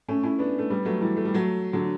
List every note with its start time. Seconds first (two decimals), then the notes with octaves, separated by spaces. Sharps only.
0.08 A3 C#4
0.23 C#4 E4
0.39 B3 D4
0.59 A3
0.70 G3 B3
0.85 F#3 A3
1.01 E3 G3
1.17 A3
1.25 G3
1.34 F#3 A3
1.73 D3 F#3